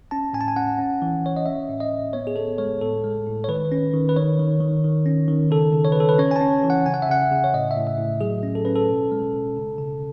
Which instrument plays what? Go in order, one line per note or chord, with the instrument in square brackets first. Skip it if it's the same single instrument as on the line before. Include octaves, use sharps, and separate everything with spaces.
[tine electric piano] C#4 A5
A2 G#5
A5
G#5
C#4 F#5
C#4
E3
E3 C#5
D#5
C#4 E5
A2
D#5
A2
B3 C#5
G#4
B3 A4
G#3 C#5
A2 A4
G#3
A2
C#5
D#3 B4
C#4
D#3
B4
D#3 C#5
D#3
D#3
D#3
C#4
D#3
C#3 A4
C#3
C#5
B4
C#3 A4
B4
C#4 C#5
G#5
A5
C#4
E3
F#5
C#3 G#5
F#5
E5
C#3 F#5
C#3
C#5
A2 D#5
E5
A2
E5
A2
F#3 G#4
C#4
A4
C#4 B4
A4
B2
G#3
B2
C#3
C#3